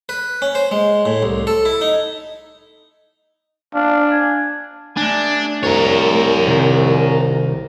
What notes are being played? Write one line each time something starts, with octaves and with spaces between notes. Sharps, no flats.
B4
C#4
C5
G#3
A2
C2
A4
E4
D#4
D4 F5
G#5
A3 D4 G#5
C2 A#4 C#5
C3 D#3 F3